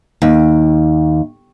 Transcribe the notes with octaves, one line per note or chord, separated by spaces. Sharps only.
D#2